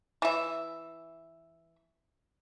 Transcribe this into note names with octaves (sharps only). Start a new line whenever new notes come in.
E3 E5